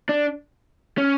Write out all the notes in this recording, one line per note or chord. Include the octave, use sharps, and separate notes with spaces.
D4
C#4